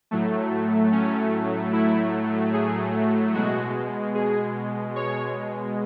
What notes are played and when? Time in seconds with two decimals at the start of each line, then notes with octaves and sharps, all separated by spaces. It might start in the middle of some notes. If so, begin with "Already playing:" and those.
0.11 A2 F#3 A3
0.92 C#4
1.73 E4
2.53 G#4
3.34 B2 G#3 F#4
4.15 G#4
4.96 C#5